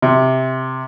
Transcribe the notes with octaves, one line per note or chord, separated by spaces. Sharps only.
C3